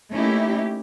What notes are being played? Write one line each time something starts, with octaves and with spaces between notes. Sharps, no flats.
A3 A#3 C#4 D#4 E4 G4